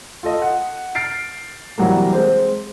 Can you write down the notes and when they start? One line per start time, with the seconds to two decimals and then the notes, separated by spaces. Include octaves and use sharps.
0.23 F4 A4 D#5
0.42 F#5
0.95 F6 A6 C7 D7
1.78 C3 E3 F#3 G3 A#3
2.13 G#3 C4 C5